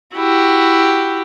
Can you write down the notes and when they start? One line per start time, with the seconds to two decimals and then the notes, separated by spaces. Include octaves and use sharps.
0.15 E4 F#4 G4